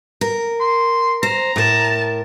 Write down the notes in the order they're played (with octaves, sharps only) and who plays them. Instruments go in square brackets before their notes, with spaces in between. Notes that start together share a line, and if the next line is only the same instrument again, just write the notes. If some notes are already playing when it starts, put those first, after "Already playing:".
[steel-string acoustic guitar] A#4
[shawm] C6
[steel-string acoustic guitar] C5 [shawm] A#5
[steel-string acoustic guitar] A2 A#4 [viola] A5